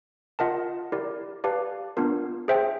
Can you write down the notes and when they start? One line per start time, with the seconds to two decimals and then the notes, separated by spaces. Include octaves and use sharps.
0.39 F4 A#4 D#5 F#5 A5
0.92 E4 G4 A#4 D5
1.44 G4 B4 D5 F5 A5
1.97 B3 D4 F4 A#4
2.48 G#4 C5 E5 G5